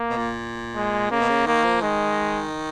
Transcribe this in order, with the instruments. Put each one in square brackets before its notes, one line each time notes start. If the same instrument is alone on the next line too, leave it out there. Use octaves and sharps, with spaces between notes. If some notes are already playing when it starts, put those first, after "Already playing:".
Already playing: [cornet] A#3
[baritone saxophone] B2
A#2
[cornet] G#3
[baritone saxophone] C#3 [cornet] A#3
[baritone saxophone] B2
C#3
[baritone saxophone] D#3 [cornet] A#3
[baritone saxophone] F3
[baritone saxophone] D#3 [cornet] G#3